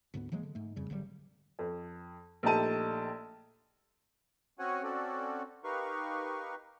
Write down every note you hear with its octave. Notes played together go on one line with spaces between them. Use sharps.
D2 G#2 A#3 B3
E3 F#3 G#3 A#3
D3
G#2 A3
F2 C#3 G3
G#1 D3 F#3 G3
F2
A#1 A3 D#4 G4 A5 D#7
C4 C#4 F#4 C#5 F#5 G#5
C4 C#4 F#4 A4 D5
D#4 G4 A#4 B4 F5 C#6